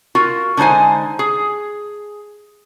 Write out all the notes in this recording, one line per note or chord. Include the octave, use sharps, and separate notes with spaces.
F4 F#4 A#4
D3 G#3 D#4 C5 G#5
G#4